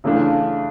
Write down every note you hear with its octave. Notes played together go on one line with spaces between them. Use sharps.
C#3 E3 A3 D4 F4